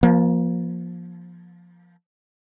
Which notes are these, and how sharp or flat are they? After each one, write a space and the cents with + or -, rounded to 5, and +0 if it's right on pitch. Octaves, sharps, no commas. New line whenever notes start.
F3 +0 A#3 +30